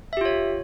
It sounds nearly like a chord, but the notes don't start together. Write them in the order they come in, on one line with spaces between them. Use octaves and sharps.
E5 G4 F4 C#5